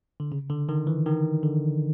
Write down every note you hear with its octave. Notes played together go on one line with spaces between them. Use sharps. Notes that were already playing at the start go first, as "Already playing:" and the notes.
D3
C#3
D3
D#3
E3
D#3
D3